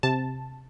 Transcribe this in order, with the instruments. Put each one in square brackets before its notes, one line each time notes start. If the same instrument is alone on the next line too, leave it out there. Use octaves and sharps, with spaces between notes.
[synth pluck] C3 A5